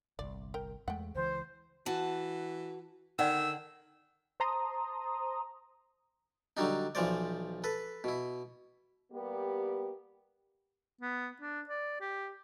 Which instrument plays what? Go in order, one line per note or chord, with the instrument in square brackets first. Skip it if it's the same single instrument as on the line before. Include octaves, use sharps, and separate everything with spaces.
[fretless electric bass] G1 C2 [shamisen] D5
[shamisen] A#4 G5
[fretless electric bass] E2 G#3 A3 [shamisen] F#5 G5
[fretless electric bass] C#2 E3 [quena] C5
[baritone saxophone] E3 [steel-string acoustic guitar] F#4 A5
[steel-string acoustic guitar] D3 [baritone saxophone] D#3 [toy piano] D5 F#5 G5 [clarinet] E6
[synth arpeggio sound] C5 A5 A#5 C6 D#6
[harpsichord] D3 F#3 G3 D4 D#4
B1 E3 F3 C5 D5
A4 B4
B2 E4
[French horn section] G3 A#3 B3 G4
[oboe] B3
D4
D5
G4